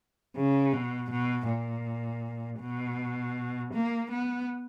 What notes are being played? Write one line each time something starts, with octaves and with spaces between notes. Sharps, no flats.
C#3
B2
B2
A#2
B2
A#3
B3